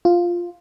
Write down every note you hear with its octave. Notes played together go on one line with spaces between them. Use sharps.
F4